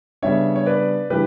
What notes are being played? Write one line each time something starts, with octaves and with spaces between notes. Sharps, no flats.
C#3 G3 B3 D4 C#5 E5
C#5
B4 D5
C#3 E3 G3 D4 G4 B4